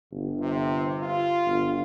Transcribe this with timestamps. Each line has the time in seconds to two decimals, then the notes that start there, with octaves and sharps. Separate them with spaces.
0.12 G1
0.41 C3
1.02 F4
1.46 G1